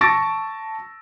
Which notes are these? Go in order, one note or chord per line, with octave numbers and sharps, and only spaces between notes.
A5 C#6 E6 A6 A#6 D7